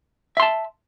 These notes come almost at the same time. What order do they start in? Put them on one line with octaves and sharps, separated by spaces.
E5 C6 A5